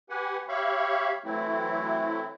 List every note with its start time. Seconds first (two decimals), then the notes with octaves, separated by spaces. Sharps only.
0.10 G4 B4 F#5 G#5
0.49 G4 C#5 E5 F5 B5 C#6
1.25 E3 F#3 A3 C4 E4